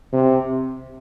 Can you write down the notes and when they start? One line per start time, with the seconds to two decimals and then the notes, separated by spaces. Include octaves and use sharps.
0.13 C3